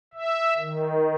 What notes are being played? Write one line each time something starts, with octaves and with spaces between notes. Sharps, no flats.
E5
D#3